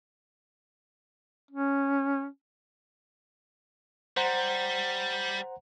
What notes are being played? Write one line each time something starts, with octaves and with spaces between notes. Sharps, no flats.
C#4
G3 C5 F#5 A#5